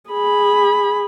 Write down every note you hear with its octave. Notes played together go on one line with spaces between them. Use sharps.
G#4 B5